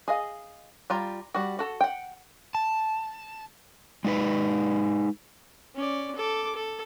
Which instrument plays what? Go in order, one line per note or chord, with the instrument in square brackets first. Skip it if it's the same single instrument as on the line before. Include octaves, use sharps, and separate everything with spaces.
[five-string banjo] G#4 D#5 F5
G3 F4 A#5
G3 F#4
F#4 A4
F#5 G5
[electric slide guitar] A5
G#3 D#4 B4
[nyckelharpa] C#4 D5
A4 D6
A4